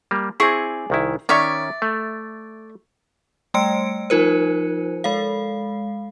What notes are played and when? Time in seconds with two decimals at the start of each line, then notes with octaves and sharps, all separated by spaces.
0.11 G3 A#3
0.40 C4 E4 G#4 D5 C#6
0.90 C2 D#3 E4
1.29 D#3 C#4 C#5 D5 E5 C#6
1.82 A3
3.54 G3 A3 G5 E6 C#7 D7
4.10 F3 D#4 F4 A#4 C5
5.04 G#3 A4 F5